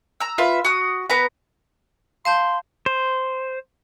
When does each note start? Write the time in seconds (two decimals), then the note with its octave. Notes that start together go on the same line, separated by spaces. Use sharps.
0.20 A#5 E6
0.38 F4 B4 E5
0.65 F#4 D#6
1.10 B3 B4 A#5
2.25 F5 A5 C6 G6
2.86 C5